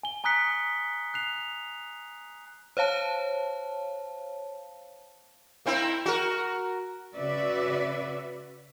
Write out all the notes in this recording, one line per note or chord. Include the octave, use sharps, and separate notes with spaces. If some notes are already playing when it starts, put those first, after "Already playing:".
G#5 G7
G#5 A#5 D#6 F#6 B6 C#7
F#6 C7 F7
C5 C#5 F5 A5
A#3 C4 E4
F#4 A#4
C#3 F#4 B4 D5 E5